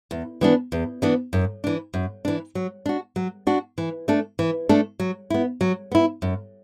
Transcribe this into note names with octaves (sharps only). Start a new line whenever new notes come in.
E2
E3 B3 D4
E2
E3 B3 D4
F#2
E3 D4
F#2
E3 D4
F#3
D4 F#4
F#3
D4 F#4
E3
A3 D4 A4
E3
A3 D4 A4
F#3
B3 E4
F#3
B3 E4
F#2